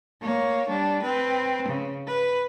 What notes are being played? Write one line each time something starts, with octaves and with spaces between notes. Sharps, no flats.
A#3 C#5
G3 D4
C4 B4
C#3
B4